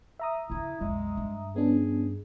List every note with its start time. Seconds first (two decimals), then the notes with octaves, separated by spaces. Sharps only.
0.20 E5 A#5 D#6
0.50 E2 C#3 E4
0.81 B1 F2 G#3
1.17 G2
1.56 B3 C#4 D4 G#4